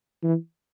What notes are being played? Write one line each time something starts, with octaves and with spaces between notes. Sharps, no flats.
E3